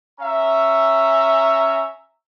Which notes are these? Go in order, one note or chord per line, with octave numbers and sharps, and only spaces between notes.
C#4 E5 A#5